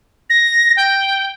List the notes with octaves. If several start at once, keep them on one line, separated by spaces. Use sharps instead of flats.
A#6
G5